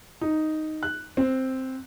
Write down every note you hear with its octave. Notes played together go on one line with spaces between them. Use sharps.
D#4
F#6
C4